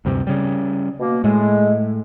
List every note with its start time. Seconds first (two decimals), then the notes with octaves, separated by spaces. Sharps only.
0.05 D2 G2 C3
0.27 C#3 G3
1.00 B2 A#3
1.24 A2 G#3